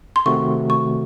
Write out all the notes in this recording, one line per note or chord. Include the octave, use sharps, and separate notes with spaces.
C6
C3 D#3 A3 C4 F#4 C#6
C#6